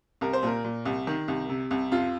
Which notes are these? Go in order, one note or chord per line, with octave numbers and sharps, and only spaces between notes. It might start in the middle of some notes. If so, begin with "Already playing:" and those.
C2 A#4
C5
A#2 A#4
A#2
C2
D#3
C2
C3
C2
F2 F4